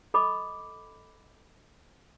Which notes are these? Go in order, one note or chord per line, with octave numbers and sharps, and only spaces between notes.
A4 D#5 B5 D6